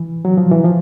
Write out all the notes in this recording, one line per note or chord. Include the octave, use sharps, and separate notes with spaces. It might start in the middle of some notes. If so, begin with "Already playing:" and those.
Already playing: E3
F#3
F3
E3
F3